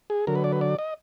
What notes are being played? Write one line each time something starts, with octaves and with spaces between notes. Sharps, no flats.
G#4
D3 F#3 A#4
B4
D5
B4
D5
D#5